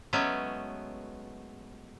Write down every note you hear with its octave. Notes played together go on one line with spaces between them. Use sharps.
F#3 G#3 A3 B3 C#4